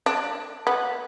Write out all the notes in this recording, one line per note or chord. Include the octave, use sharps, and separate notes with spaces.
D4
B3